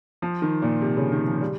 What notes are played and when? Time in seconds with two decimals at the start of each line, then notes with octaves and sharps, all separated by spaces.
0.22 F3
0.42 D#3
0.62 A#2
0.82 C3
0.97 C#3
1.12 D#3
1.27 F3
1.41 G3